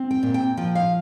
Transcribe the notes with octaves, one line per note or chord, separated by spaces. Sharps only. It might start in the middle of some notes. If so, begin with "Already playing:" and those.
Already playing: C4
G5
A#2
G5
F3 G5
F5